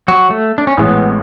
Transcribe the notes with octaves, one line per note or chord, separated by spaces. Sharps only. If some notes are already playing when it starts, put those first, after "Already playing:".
F#3 F#4
A3
D4
C#4
A1 A2 G#3 B3